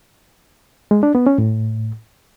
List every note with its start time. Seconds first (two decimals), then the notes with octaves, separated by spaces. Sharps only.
0.91 G#3
1.03 D4
1.15 B3
1.27 C#4
1.38 A2